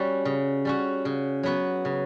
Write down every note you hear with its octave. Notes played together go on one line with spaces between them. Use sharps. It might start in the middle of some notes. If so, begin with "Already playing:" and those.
Already playing: G3 C#4 F#4
C#3
G3 C#4 F#4
C#3
F#3 B3 F#4 B4
C#3